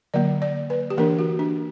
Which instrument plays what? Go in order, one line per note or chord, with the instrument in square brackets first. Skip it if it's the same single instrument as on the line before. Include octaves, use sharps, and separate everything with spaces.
[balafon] D3 F#3 A#3 D5
D5
B4
G4
E3 A#3 D4 A#4
F#4
D4